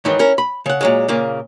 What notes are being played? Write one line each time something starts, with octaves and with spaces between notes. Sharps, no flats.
G#2 D#3 E3 F#3
C#4 E4 A#4
B5
C#3 F#5
A#2 F#3 G#3
A#2 C#3 A#3